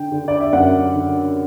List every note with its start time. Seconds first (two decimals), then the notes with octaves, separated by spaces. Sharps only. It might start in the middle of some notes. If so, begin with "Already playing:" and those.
Already playing: D3 G5
0.12 D3
0.28 D5
0.40 E5
0.53 F#2 F#5
0.94 D3